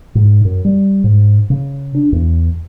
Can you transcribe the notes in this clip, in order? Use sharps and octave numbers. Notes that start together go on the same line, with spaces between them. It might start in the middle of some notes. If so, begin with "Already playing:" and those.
G#2
F#2
G3
G#2
C#3
D4
E2